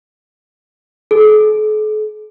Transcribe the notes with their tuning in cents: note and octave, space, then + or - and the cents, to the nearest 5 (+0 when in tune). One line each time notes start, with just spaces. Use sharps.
A4 -45